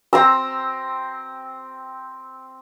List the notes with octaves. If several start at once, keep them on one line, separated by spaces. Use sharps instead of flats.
C4 A#5 E6